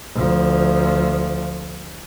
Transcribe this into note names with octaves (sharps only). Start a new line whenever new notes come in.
D2 F3